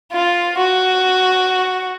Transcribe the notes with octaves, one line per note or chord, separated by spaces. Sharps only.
F4
F#4